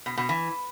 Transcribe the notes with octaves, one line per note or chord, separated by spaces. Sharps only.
B2
B2
E3